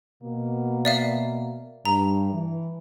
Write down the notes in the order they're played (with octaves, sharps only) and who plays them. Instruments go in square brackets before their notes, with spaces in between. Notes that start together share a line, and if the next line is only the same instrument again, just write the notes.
[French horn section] B2 A#3
[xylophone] D5 E5 F5
[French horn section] G2 [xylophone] A#5
[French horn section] E3